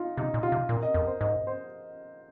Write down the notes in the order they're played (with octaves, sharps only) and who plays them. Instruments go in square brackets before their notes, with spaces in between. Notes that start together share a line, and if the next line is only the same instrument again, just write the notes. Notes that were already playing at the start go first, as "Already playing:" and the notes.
Already playing: [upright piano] D#4 F4
[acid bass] C3 [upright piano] D#4
[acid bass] A#2
[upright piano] F4
[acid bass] C3
[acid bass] A#2 [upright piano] A#4
[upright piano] D#5
[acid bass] F2 [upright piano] A#4
[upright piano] C5
[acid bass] G#2 [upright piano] D#5
[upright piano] C5